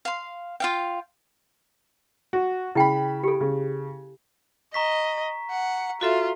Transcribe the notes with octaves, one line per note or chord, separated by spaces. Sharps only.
F5 C6
F4 F5 G5
F#4
C#3 E4 G5 B5
G4 A4
C#3
D#5 A#5 C#6 B6
F#5
F4 F#4 A4 E5